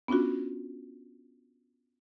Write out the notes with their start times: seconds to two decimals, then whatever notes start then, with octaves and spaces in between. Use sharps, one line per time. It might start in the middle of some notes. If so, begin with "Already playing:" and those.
0.08 B3 C#4 D4 F4 F#4